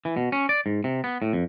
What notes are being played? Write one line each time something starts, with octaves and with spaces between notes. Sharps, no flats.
E3
B2
C#4
D5
G#2
C3
B3
A2
F2